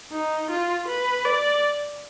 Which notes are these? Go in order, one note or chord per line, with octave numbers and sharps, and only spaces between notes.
D#4
F4
B4
D5